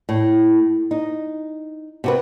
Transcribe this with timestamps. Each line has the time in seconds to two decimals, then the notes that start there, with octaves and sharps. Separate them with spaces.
0.09 A2
0.91 D#4
2.04 C3 F#4 B4